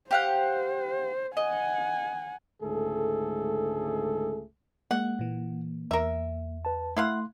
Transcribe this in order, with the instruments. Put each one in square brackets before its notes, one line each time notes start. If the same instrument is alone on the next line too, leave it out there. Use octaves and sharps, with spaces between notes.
[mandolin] G4 F5 F#5 [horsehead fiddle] C5
[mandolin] D#5 [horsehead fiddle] F#5 G#5
[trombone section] C#2 G#2 D3 A3 G#4 A4
[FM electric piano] G#3 [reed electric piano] A#3 [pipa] F#5
[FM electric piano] A#2 E3
[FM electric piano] E2 [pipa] A#4 E5
[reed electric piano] B4 A5
[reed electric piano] A3 C6 [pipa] E4 F5 F#5